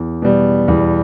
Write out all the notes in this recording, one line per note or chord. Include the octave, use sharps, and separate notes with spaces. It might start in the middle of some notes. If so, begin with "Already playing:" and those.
Already playing: E2
B2 G3
E2